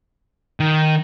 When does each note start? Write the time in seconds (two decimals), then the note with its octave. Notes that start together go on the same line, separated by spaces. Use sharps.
0.60 D#3